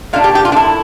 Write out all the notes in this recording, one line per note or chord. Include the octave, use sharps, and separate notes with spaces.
A#2 A3 D4 F5
G4
G4
F4
D4
E4